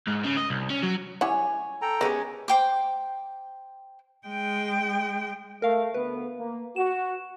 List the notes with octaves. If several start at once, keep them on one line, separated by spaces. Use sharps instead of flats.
G#2
C#3
D#5
C2
C#4
F#3
G3 E4 C#5 F#5 G#5
A4 G5 A#5
G#3 B3 C#4 G4
C5 G5 D6
G#3 G5
A3 A#4 F5
D2 A3 B3 B4
A#3
F#4 E7